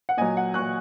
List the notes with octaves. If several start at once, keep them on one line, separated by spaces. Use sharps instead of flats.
F#5
A#2 F#3 D#5 G#5
F#5
A#2 F#3 C#6 F#6